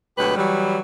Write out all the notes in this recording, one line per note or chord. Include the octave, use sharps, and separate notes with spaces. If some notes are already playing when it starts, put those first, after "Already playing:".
D2 B2 F#3 G#3 G4 B4
E3 F#3 G3